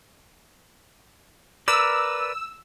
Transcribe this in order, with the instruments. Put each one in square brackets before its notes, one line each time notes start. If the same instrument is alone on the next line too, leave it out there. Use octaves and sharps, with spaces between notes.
[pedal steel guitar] A#4 B4 D5 [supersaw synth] E6